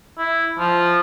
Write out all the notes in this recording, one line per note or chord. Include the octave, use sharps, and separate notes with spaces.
E4
F3